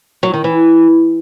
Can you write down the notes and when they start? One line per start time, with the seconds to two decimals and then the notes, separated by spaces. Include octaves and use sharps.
0.23 F#3
0.34 D#3
0.44 E3